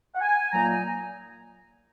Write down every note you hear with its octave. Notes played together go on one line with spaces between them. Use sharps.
F#5
G#5
A#2 F#3 A#3 D#4 A#5
G#5